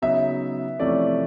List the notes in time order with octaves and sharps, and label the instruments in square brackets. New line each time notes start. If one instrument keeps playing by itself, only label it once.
[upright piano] C#3 F#3 B3 D#4 [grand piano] E5
[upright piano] F2 C3 E3 A3 C#4 [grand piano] D5